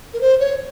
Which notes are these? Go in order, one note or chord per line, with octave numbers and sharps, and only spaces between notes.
A#4
C5
C#5